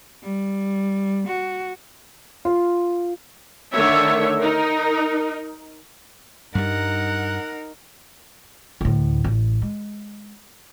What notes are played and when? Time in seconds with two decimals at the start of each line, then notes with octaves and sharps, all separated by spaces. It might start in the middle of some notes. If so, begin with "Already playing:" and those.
0.23 G3
1.28 F#4
2.45 F4
3.73 D3 D#3 A3 C#5 E5
4.38 D#4 A#4
6.55 G2 G3 D#4 A#4 F#5
8.81 D2 A2
9.24 A1
9.62 G#3